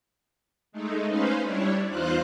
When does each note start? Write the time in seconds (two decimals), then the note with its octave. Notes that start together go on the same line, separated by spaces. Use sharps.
0.72 G#3 A3 D#4
1.06 C#4 D#4 B4 C5 F5
1.41 G3 D4 E4 C#5
1.88 E2 D#4 F4 C5 F5 F#6